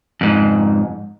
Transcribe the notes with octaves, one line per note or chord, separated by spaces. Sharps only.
F2 G#2